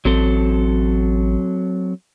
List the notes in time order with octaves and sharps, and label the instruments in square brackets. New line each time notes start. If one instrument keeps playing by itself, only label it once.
[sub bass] A1 [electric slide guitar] F#3 C4 A4